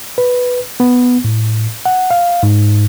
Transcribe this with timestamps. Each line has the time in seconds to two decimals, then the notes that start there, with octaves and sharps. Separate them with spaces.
0.18 B4
0.80 B3
1.24 A2
1.86 F#5
2.11 F5
2.43 G#2